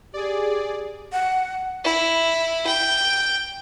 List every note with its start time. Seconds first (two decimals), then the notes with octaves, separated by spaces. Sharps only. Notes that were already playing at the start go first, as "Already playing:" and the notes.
0.14 G4 G#4 D5
1.12 F#5
1.84 E4
2.66 G5